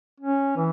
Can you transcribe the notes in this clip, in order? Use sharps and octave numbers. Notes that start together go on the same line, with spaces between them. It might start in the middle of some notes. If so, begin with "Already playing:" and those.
C#4
E3